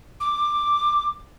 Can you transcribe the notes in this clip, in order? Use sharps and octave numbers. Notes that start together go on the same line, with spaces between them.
D6